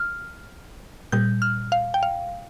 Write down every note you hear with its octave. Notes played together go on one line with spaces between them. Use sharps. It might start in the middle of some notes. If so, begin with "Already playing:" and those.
Already playing: F6
A#2 G3 G6
F6
F5
G5
F5